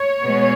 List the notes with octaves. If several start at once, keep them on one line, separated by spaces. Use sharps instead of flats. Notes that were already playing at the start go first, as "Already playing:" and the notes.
Already playing: C#5
B2 G#3 B3